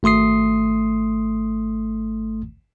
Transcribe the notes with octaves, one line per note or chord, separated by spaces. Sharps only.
G#1 A3 C6 D#6 C7